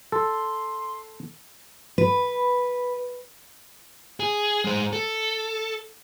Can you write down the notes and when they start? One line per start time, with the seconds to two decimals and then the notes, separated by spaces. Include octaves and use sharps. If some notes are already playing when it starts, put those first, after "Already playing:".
0.12 A4 C6
1.98 B4
4.20 G#4
4.65 G#3 C5
4.93 A4